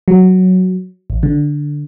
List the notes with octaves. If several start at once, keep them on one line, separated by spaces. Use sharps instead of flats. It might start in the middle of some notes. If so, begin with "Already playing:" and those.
F#3
A1
D3